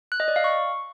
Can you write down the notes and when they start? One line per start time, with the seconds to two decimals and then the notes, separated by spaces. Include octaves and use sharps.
0.12 F#6
0.20 D#5
0.28 D5
0.36 F5
0.44 C#6